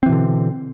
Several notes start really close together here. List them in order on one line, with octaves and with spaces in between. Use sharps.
C4 E3 B2 D3